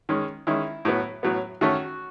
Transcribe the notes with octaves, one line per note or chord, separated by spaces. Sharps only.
D#3 G#3 C#4
D#3 G#3 C#4 E4
A2 F#3 B3
A2 F#3 B3
D#3 A3 C#4 F#4